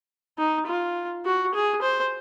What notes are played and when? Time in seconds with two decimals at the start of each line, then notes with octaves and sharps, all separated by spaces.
0.38 D#4
0.66 F4
1.25 F#4
1.54 G#4
1.82 C5